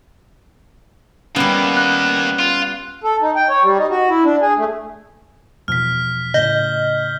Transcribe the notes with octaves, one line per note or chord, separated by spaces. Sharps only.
D#3 G3 A#3 B3 C#4
F#6
F4
A4
D#4
G5
C#5
G3
D#4
F#4
E4
D4
G#4
A3
E2 B2 F3 F6 B6
A2 C#3 D#5 G6 G7